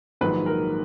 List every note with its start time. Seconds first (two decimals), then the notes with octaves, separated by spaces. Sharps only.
0.21 A#1 G#2 D#3 F#3 B4
0.46 A#4